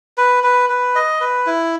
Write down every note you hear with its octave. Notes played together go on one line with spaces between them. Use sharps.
B4
B4
B4
D#5
B4
E4